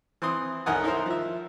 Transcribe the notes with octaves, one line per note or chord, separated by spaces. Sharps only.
E3 C4 C6 D#6
B1 D#3 A#4 F#5 G#5 D#6
D#4 E4 A#4 C5
F3 E5